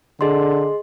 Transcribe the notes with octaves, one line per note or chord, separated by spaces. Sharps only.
D3 G#4 D#5 C6